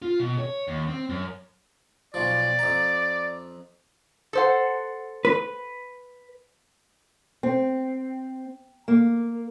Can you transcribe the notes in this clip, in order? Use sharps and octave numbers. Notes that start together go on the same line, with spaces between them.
F4
B2
C#5
D#2
C4
F#2
B1 F3 D5
F2 A#5
A4 C5 F#5
B4
C4
A#3